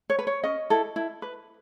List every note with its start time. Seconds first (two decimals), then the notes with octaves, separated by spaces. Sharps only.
0.10 C#5
0.19 B4
0.27 C#5
0.44 C#4 D#5
0.70 E4 A4
0.96 E4
1.22 B4